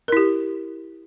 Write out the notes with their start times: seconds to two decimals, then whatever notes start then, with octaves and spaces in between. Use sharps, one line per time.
0.08 A#4
0.12 E4
0.17 G4